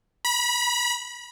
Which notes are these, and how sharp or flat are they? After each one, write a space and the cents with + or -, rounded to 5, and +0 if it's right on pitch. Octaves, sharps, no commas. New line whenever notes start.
B5 -30